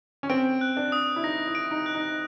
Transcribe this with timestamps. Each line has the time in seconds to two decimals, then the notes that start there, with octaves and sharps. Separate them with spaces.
0.23 C#4
0.30 C4 D7
0.61 F#6
0.77 D4
0.92 D#6
1.16 E4
1.24 D#4 A#6
1.47 E4
1.55 D7
1.71 D#4
1.86 F#6
1.94 D#4